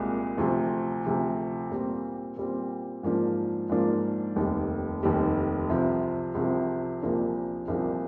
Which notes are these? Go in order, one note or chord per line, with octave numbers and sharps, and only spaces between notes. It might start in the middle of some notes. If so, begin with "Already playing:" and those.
Already playing: C2 A#2 G#3
D2 C3 F3
D2 C3 F3
A#2 G3 C4
A#2 G3 C4
G#2 F3 A#3 D4 F4
G#2 F3 A#3 D4 F4
F1 D#2 D#3 G3
F1 D#2 D#3 G3
C2 C3 F3
C2 C3 F3
C2 A#2 F3 A#3 D4
C2 A#2 F3 A#3 D4